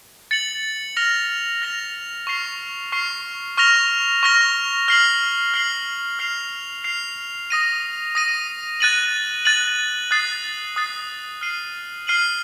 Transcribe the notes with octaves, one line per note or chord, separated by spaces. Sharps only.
A6 C#7 F#7
F6 A#6 F7
F6 A#6 F7
C#6 F6 C7 F7
C#6 F6 C7 F7
C#6 F6 A#6 F7
C#6 F6 A#6 F7
F6 C7 F#7
F6 C7 F#7
F6 C7 F7
F6 C7 F7
D#6 A#6 D#7
D#6 A#6 D#7
F#6 A6 D#7 F#7
F#6 A6 D#7 F#7
D#6 F#6 A6 C7
D#6 F#6 A6 C7
F6 C7 D#7 F#7
F6 C7 D#7 F#7